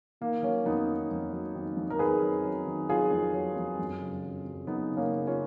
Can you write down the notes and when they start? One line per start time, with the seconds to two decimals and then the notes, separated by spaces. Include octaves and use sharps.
0.21 D#3 A#3
0.43 F#3 A#3 C#4
0.66 F2 B3 D#4
0.88 D#3
1.11 F2
1.33 F#3
1.55 D#3
1.77 F2
1.90 A#4
1.99 D#3 G#4 B4
2.22 F#3
2.45 F#3
2.66 D#3
2.89 F#3 F4 G#4
3.11 F2
3.34 F#3
3.56 F2
3.79 F#2
4.01 C#3
4.23 F#3
4.45 F#2
4.67 F#3 B3 D#4
4.91 C#3
4.97 A#3 C#4
5.13 C#3
5.27 C#4 F4